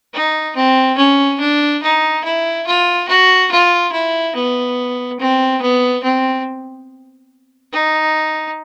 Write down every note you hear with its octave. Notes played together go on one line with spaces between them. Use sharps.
D#4
C4
C#4
D4
D#4
E4
F4
F#4
F4
E4
B3
C4
B3
C4
D#4